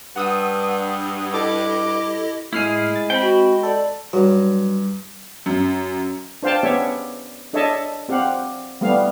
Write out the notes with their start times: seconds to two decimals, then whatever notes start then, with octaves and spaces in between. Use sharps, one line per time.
0.16 G2 F#5 D#6 E6
1.34 E4 G4 A4 D#5 D6
2.53 A2 G#3 E4 G#4 F6 C7
2.96 A6
3.10 C4 G5 B5
3.21 F#4
3.63 A4 D5
4.13 G2 F#3
5.46 F#2
6.43 D4 C5 F5 G5 A5
6.63 B3 C#4 G4 C#5 E5
7.53 D4 A4 C#5 D#5 E5 A5
8.09 C4 G4 F5 F#5
8.81 G3 A3 B3 F5